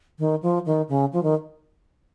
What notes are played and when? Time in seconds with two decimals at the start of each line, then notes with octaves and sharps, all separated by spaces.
0.19 D#3
0.43 F3
0.66 D#3
0.89 C#3
1.13 F3
1.23 D#3